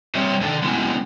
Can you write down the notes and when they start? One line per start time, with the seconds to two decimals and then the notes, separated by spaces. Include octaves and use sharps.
0.15 G3 C4 C5 C#5 E5
0.41 D3 D#3 A4
0.62 G#3 B3 C#4 E4